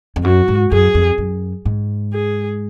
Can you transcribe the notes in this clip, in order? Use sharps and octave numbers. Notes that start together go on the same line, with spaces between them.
F2
F#2 F#4
G#2
F#2 G#4
F2
F#2
G#2
G#4